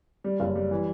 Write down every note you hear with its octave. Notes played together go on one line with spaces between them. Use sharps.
G3
F#1
G3
E3